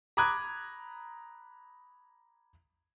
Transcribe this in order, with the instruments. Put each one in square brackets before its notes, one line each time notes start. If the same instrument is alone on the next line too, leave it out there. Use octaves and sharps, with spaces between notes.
[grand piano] A#5 B5 D6 D#6 F#6 G#6